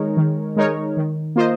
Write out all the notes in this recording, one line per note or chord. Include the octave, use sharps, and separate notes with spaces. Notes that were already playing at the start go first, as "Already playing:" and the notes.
Already playing: D#3 G#3 D#4 A#4 C#5
D#3
G#3 D#4 A#4 C#5
D#3
A#3 F4 C5 D#5